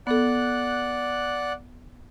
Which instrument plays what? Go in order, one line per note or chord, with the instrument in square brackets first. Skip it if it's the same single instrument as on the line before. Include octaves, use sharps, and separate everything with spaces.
[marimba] B3 A4 [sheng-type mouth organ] D5 F#5 F#6